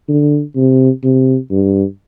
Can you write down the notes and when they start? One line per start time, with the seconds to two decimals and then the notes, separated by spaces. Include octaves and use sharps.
0.08 D3
0.56 C3
1.04 C3
1.51 G2